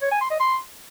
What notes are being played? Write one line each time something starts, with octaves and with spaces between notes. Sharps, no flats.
C#5
G#5
C6
D#5
C6